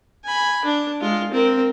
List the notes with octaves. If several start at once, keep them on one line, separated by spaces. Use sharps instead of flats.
G#5 B5
D4
G#3 F4
C4 A#4